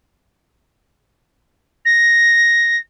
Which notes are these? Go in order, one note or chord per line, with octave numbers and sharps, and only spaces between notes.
A#6